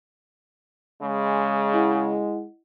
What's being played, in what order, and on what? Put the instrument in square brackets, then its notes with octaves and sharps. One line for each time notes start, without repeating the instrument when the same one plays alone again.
[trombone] C#3 [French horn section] G#3
[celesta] E4 D#5 F#5